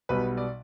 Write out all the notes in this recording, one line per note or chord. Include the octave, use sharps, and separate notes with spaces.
B1 B2 G3 B3 B4
D5